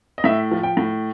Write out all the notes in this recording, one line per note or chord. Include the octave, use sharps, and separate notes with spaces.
D#5
A2 E5
F3
G5
A2